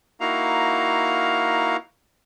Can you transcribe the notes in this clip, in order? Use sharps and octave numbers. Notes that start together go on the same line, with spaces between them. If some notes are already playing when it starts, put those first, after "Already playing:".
A#3 D#4 E4 F#4 F5 A#5